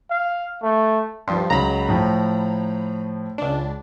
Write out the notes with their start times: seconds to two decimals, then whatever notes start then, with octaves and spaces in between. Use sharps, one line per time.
0.11 F5
0.63 A3
1.28 G2 F3 C6
1.50 C#2 F#3 A#5 B5
1.89 A2 F3
3.38 C#2 D4